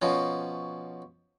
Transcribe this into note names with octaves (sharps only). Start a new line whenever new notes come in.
B2 F3 C#4